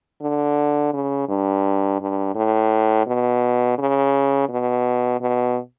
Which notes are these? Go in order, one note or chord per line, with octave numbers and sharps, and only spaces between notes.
D3
C#3
G2
G2
A2
B2
C#3
B2
B2